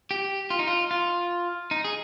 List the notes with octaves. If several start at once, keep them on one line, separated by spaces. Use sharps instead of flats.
G4
F4
D#4
F4
F4
D#4
G#4